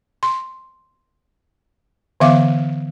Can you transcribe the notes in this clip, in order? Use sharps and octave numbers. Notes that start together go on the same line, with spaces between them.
C6
D3 E3 B3 E5 F5 D6